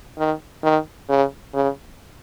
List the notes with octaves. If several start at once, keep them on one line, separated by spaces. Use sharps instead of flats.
D#3
D#3
C#3
C#3